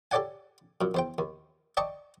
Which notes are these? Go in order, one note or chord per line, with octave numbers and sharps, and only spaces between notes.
G4 A4 C#5 D5 F#5 G#5
F#2 A#2
E2 C5 G5
D#2
D5 D#5 G5 A5 C#6